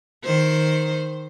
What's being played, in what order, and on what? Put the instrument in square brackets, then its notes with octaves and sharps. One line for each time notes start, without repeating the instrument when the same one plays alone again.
[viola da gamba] D#3 C5